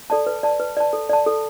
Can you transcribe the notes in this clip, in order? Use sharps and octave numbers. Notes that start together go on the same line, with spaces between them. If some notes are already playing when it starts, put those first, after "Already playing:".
A4 D5 A5
B4
D5 A5
B4
D5 A5
A4
D5 A5
A4